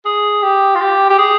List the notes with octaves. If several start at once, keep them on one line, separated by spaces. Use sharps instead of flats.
G#4
G4
F4
G4
G4
G#4